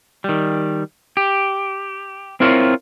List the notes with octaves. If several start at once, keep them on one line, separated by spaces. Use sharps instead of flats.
D#3 G3
G4
C4 E4 F4 A#4 C#5